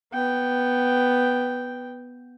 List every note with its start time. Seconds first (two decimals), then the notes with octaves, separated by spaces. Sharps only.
0.13 B3 G5